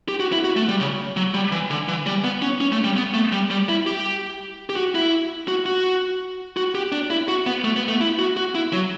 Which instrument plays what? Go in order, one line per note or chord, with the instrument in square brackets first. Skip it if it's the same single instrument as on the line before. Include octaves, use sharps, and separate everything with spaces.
[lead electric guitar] G4
F#4
E4
F#4
A3
G3
C#3
F#3
G3
E3
D3
E3
G3
B3
C#4
C#4
A3
G3
B3
A3
G3
G3
E4
G4
G4
F#4
E4
F#4
F#4
F#4
G4
D4
E4
F#4
B3
A3
B3
A3
E4
F#4
F#4
E4
F#3